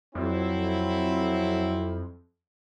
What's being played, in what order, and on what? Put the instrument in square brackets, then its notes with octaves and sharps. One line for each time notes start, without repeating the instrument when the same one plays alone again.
[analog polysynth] F2 [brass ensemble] F#3 C4 E4